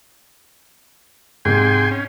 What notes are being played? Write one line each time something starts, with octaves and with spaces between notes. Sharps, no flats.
G#2 C3 G5 G#5 C6
C#4